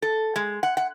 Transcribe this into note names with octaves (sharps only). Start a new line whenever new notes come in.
A4
G#3
F#5
F#5